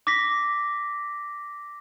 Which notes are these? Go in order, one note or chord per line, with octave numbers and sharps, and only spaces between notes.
D6 A#6 B6